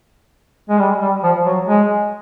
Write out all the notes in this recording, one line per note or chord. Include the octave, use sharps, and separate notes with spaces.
G#3
G3
G3
F3
F#3
G#3